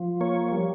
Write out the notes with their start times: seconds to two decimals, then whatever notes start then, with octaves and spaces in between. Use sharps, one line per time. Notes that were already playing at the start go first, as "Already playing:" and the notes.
Already playing: F3
0.21 A#3 C#5
0.52 G3